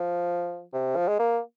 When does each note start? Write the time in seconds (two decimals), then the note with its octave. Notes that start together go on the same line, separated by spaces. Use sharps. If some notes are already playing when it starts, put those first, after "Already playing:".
Already playing: F3
0.73 C3
0.96 F3
1.08 G#3
1.19 A#3